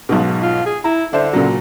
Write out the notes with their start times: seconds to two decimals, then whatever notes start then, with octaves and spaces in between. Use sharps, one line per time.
0.09 B1 G#2 B2
0.43 F4
0.66 G#4
0.84 E4 A#5
1.13 D3 D4 E4 C5
1.33 A#2 C#3 F#3